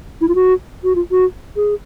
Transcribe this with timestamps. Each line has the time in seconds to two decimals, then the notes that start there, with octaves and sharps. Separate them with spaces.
0.21 E4
0.28 F4
0.35 F#4
0.84 F#4
0.95 F4
1.11 F#4
1.56 G#4